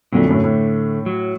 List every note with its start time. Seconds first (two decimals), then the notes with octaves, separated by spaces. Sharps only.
0.13 F2 A#2 D3 F#3 A3
0.29 F#2 A2
0.44 A2
1.06 F#3